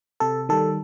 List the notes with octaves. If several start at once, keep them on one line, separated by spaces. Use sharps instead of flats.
C3 A4
D#3 G3 A4